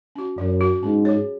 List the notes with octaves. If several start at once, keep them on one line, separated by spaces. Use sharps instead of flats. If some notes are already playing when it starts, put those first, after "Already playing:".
C#4 F#4
F#2 F#3
C#4 F#4
G#2 C#4
G#4 C#5